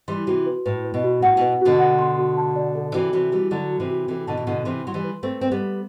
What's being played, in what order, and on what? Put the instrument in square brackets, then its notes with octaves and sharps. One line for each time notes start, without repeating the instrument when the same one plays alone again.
[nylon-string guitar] E3 G3 [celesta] C6
[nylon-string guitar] C3 E3 [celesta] F#4
[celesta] B4
[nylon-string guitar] A2 [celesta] B4
[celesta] B4
[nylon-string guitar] B2
[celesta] F#4
[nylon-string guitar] A2 [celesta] F#5
[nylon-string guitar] B2 [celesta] B4
[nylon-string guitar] B2 D3 [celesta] F#4
[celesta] F#5
C6
F#4
A5
D5
A4
[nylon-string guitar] C3 E3 [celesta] F#4
[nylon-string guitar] C3 E3 [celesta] F#4
[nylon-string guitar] E3 G3 [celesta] F#4
[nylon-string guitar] D3 F#3 [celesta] A4
[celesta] F#4
[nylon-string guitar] C3 E3
[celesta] F#4
[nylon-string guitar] C3 E3 [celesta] A4
[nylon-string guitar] B2 D3 [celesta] A5
[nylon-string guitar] E3
[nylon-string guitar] B2 D3 [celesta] A4
[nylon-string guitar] C3 E3 [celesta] C6
[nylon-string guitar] F#3 [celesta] C6
[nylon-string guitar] E3 G3
[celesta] B4
[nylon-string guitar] A3 C4 [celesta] B4
[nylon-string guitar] C4 [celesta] B4
[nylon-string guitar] G3 B3
[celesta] B4